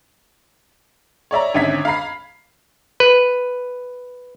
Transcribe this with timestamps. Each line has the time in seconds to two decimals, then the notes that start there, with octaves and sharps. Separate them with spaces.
1.31 C#5 D5 E5 A#5
1.54 G#1 D3 C#4 E5 G#6 B6
1.85 F5 A#5 B5 C7
3.00 B4